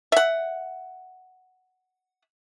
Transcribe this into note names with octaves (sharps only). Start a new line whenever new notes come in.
E5 F#5